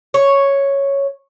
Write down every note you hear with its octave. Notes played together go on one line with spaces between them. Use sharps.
C#5